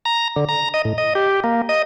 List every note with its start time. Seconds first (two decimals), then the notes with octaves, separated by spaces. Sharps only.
0.05 A#5
0.36 D3
0.49 A#5
0.74 D#5
0.85 A2
0.98 D#5
1.15 G4
1.44 A#3
1.69 D#5